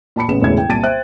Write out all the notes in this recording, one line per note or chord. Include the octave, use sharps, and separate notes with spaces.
A#2 A5 B5 C#7
A1 C#3 B3 E7
E1 E2 A2 C#3 E4 G#6
G5
C2 A#2 A5 A6 D7 D#7
C5 E5 G5 F#6